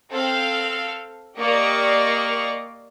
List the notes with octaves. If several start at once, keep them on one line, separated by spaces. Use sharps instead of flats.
C4 A4 F5
A#3 G4 D5 D#5 F5 C#6